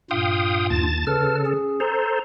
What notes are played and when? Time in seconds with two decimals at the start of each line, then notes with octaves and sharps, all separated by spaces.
0.11 G2 A#2 F4 F5 G5 D#6
0.70 D#2 A5 A6
1.07 C#3 A4 B4 A5 F6
1.46 C#4 G#4
1.80 A4 C5 A#5